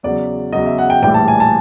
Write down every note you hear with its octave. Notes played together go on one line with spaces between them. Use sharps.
E2 C#3 F#3 D5
E2 C#3 F#3 D#5
E5
F#5
G5
A#1 A2 E3 G3 G5
A5
G#5
A5